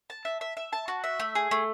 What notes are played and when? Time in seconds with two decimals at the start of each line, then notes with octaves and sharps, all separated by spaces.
0.10 A5
0.25 E5
0.41 E5
0.57 E5
0.73 A5
0.88 F#4
1.04 E5
1.20 A3
1.35 G#4
1.51 A3